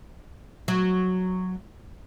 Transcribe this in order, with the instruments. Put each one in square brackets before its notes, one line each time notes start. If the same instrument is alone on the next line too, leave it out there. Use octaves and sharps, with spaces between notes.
[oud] F#3